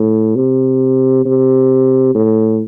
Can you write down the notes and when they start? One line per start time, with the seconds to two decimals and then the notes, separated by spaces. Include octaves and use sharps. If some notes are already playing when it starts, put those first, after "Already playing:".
Already playing: A2
0.36 C3
1.25 C3
2.15 A2